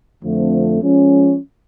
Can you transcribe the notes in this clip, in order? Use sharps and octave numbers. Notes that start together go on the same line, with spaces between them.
F2 D3 F3 A3 C4
F3 G#3 C#4